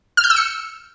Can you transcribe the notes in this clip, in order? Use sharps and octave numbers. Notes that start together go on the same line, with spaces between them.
F6
G6
E6
C#7